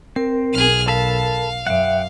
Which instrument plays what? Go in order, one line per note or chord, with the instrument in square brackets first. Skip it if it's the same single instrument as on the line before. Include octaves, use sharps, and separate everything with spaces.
[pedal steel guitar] C4 [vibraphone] A#4
[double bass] B1 [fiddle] G#4 F6
[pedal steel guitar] A4 A5 B5 [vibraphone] A#4 [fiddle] F5
[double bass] F#2 [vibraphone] E5 [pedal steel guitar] F#5 G5